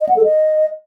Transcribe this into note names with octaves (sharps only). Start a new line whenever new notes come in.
D#5
F#5
A4
D#5